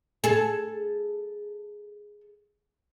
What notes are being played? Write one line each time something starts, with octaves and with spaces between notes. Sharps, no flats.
G#4 A4